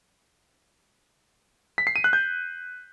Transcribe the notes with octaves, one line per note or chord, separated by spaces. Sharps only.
B6
C7
D#7
F#6
G6